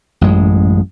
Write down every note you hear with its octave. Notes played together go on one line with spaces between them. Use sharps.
A1 F#2 G#3